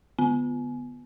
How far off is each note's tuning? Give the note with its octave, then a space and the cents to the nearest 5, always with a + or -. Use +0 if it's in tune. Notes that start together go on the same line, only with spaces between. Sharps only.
D3 +0 B3 +0